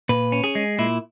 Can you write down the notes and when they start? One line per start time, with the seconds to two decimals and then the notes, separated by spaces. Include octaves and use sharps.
0.09 A#2 B4
0.32 C#4
0.44 G#4
0.55 G#3
0.79 A#2 E4